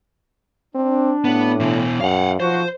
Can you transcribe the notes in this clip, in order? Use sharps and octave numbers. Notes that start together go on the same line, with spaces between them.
C4 D4
A2 B3
B2 E3
F#2 F5 F#5
B1 F3 F#4 C5